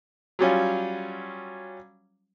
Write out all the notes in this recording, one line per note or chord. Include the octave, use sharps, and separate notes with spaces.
F#3 G3 C#4 F4